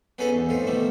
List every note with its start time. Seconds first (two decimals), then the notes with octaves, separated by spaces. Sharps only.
0.18 B3 C#4 D#4 G#4 A4 B4
0.33 E2
0.49 F2 A2 D#4 F4
0.67 B2 D#3 G3 A3